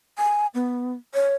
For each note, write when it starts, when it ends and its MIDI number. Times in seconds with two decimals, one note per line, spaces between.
0.18 0.47 80
0.55 0.93 59
1.14 1.36 73